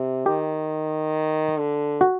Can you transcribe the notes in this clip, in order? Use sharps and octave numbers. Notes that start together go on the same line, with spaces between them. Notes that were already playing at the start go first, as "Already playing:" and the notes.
Already playing: C3
D#3 G4
D3
F#4